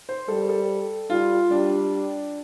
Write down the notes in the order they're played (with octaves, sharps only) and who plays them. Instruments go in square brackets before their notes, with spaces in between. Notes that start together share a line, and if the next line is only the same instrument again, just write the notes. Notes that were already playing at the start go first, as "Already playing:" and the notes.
[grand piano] C5
[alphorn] G3 [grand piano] A4
[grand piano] A4
[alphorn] G3 [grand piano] F4
[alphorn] G3 [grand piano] D4